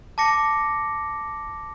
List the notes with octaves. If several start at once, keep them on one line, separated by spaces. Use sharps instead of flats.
A5 D6 A#6 C#7